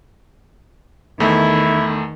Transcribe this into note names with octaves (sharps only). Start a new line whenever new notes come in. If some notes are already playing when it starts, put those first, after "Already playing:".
E2 D#3 A3 E4